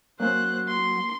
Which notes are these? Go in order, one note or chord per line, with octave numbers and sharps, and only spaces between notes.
F#3 A#3 C#4 C5 F#6
C6